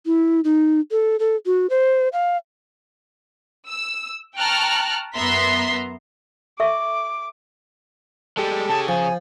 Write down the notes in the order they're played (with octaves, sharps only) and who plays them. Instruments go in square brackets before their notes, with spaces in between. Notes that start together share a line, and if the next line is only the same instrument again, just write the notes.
[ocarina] E4
D#4
A4
A4
F#4
C5
F5
[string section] E6
G5 A5 A#5 C#6 F6 F#6
F#2 B3 E5 A#5 C6 B6
[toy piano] A4 E5 C#6 [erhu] D6
[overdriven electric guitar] G3 G#3 [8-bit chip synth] G4 A4
[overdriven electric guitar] C#3 G#4 [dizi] A5
[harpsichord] F3 [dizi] G#5